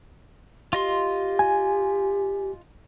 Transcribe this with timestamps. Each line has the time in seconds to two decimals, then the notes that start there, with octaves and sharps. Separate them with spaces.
0.73 F4 G4 D#5 C6
1.39 G#5